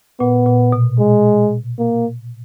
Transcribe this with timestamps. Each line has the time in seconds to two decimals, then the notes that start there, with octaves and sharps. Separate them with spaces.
0.20 A#2 B3
0.46 A#2
0.72 B2
0.99 G#3
1.78 A#3